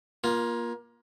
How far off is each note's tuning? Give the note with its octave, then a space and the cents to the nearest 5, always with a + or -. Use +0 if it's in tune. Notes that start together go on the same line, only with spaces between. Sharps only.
A#3 +25 F4 +0